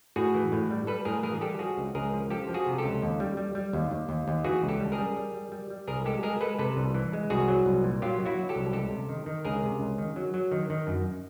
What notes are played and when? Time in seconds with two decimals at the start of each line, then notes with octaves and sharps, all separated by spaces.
0.16 A2 F#4 G#4
0.34 E3
0.52 A2
0.71 G3
0.87 G3 A4 B4
1.05 A2 G#4 A#4
1.23 E3 G#4 A#4
1.35 G#4
1.41 G3 G4 A4
1.59 F3 F#4 G#4
1.77 C#2
1.95 C#2 G#4 A#4
2.13 F3
2.30 F3 G4 A4
2.49 F3
2.54 F#4 G#4
2.67 C3
2.78 G4 A4
2.84 C#2
3.02 D#2
3.20 G3
3.37 G3
3.55 G3
3.73 D#2
3.91 D#2
4.09 D#2
4.28 D#2
4.44 E3 F#4 G#4
4.62 C#2
4.68 G4 A4
4.80 G3
4.92 G#4 A#4
4.98 G3
5.16 G3
5.34 G3
5.52 G3
5.70 G3
5.88 C2 G#4 A#4
6.05 G#3 G4 A4
6.23 G#3 G#4 A#4
6.41 G#3 A4 B4
6.59 C3 A4 B4
6.77 C2
6.94 E3
7.13 G#3
7.30 C2 F#4 G#4
7.48 F#3
7.66 C2
7.84 A#2
8.02 F#3 F4 G4
8.20 F#3
8.25 E4 F#4
8.38 F#3
8.49 G4 A4
8.56 C2
8.73 C#2 G4 A4
8.91 C3
9.09 D#3
9.26 D#3
9.45 C#2 G#4 A#4
9.63 C3
9.80 C#2
9.98 D#3
10.16 F#3
10.34 F#3
10.51 D#3
10.70 D#3
10.87 F#2